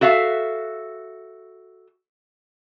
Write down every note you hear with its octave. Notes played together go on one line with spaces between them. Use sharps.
F#4 A4 E5 F5